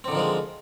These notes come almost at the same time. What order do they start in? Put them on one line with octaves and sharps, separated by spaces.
C4 D3 D#3 F3 G#3